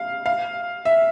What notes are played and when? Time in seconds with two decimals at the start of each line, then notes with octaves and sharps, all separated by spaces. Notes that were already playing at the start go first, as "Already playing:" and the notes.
Already playing: F5
0.26 F5
0.85 E5